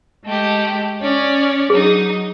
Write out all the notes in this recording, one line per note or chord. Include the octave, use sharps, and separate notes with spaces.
G#3 A3 G4
C#4 C#5 D5
F#3 D#4 G#4